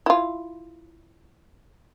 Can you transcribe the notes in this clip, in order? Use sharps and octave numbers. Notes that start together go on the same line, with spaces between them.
E4 F4